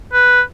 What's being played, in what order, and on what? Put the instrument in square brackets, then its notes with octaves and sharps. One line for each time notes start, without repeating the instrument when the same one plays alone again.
[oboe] B4